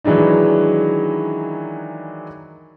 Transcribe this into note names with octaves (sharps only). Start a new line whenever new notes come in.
D#3 E3 F#3 G#3 D4 D#4